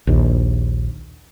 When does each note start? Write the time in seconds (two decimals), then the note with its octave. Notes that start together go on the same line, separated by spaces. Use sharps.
0.07 A#1 D#2